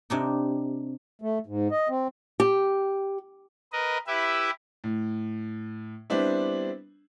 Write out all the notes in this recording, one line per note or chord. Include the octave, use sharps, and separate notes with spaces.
C3 D4 D#4
A3
G#2
D#5
C4
G4
A#4 B4 D#5
E4 G4 B4 E5
A2
G3 B3 C4 D4 E4